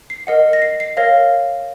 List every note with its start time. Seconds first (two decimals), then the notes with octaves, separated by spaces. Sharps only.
0.10 C7
0.27 A#4 D#5 F#5
0.53 A#6
0.62 C7
0.80 C7
0.97 A#4 C#5 F5 A#6